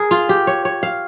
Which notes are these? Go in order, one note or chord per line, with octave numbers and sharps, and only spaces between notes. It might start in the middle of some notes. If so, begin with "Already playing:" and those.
Already playing: G#4 A#4
F4
G4
C#5
C#5
F5